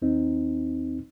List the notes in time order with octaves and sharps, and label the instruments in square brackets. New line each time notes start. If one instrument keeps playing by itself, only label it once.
[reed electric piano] D#2 C4 D#4